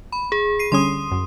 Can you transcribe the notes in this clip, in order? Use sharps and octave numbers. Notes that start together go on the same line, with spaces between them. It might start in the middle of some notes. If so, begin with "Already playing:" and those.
B5
G#4
C7 D#7
D3 G3 C#4 C6 D#6
F#2